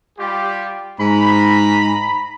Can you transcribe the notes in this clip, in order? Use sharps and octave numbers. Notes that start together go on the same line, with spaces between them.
G3 F4 G4
G#2 A#5 B5